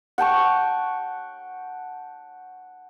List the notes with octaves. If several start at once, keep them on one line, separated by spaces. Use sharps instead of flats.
F#5 G5 A5 C#6